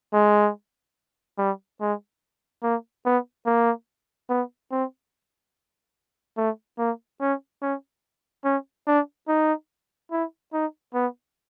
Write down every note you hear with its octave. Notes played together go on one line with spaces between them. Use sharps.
G#3
G3
G#3
A#3
B3
A#3
B3
C4
A3
A#3
C#4
C#4
C#4
D4
D#4
E4
D#4
B3